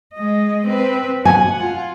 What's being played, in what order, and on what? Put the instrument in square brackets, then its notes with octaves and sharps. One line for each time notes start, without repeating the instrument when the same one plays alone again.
[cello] G#3 D#5
C4 B4
[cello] F#5 [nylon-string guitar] G#5
[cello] F4